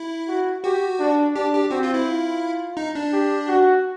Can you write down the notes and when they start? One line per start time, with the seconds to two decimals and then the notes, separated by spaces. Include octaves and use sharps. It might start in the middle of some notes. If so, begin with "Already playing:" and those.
Already playing: E4
0.28 F#4
0.64 F#4 G4
1.00 D4
1.35 D4 G4
1.53 G4
1.70 C4 F#4
1.83 F4
1.94 E4
2.06 F4
2.77 D#4
2.95 D4
3.13 G4
3.48 F#4